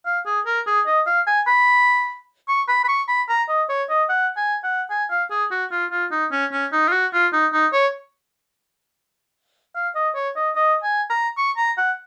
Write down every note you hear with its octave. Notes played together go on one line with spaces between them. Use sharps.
F5
G#4
A#4
G#4
D#5
F5
G#5
B5
C#6
B5
B5
C#6
B5
A#5
D#5
C#5
D#5
F#5
G#5
F#5
G#5
F5
G#4
F#4
F4
F4
D#4
C#4
C#4
D#4
F4
F#4
F4
D#4
D#4
C#5
F5
D#5
C#5
D#5
D#5
G#5
A#5
C#6
A#5
F#5